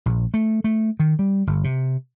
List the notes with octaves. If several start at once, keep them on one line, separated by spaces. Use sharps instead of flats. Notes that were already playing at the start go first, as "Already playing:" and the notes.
A#1
A3
A3
D#3
G3
G1
C3